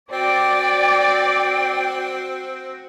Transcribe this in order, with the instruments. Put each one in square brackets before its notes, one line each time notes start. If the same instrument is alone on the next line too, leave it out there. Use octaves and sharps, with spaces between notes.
[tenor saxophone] C4 [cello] F#4 [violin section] D5 [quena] G5